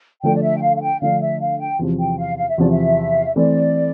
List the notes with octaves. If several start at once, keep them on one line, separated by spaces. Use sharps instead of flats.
D3 F3 A3 D4 G5
D5
E5
G5
F5
F5
G5
D3 F3 A3 D4 F5
E5
F5
G5
E2 C3 F3
G5
F5
F5
E5
E2 C3 F3 D5
E5
F5
E5
E3 A3 C4 D5